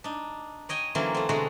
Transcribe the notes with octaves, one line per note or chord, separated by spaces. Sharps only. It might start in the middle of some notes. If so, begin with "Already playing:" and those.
D4 D#4
C#5 D#5 G5 G#5
D3 E3 F#3 A#3 C4 C#4
A3 C4
B2 D3 G#3 A3 F#4 A#5